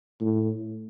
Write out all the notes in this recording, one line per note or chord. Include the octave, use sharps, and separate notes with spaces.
A2